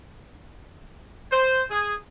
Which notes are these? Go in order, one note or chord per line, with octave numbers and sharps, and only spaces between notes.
C5
G#4